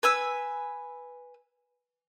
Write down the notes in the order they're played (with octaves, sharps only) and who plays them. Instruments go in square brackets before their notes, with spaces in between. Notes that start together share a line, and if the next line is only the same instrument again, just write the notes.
[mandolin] B4 G#5 E6